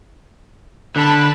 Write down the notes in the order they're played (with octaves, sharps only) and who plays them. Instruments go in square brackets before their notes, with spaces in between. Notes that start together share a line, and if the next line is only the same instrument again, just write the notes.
[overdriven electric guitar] D3 [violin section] A5 B5